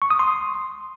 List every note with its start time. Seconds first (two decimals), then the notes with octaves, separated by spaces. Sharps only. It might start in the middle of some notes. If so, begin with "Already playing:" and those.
0.02 C#6
0.10 D#6
0.19 C6